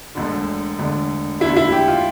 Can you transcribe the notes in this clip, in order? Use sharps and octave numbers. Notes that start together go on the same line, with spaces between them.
E1 D2 D3
E1 D2 D3
E1 D2 D3 E4
E4
G4
F4